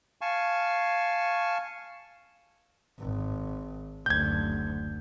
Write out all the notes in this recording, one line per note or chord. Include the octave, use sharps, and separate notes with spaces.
F5 G#5 A5 C#6
G#1
F#1 D2 G6 G#6